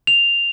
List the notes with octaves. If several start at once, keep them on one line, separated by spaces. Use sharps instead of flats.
F7